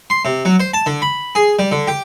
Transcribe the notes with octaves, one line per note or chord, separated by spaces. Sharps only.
C6
C3
F#3
C5
A5
D3
B5
G#4
G3
D3
G4